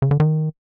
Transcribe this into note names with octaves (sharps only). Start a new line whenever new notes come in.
C#3
D3
D#3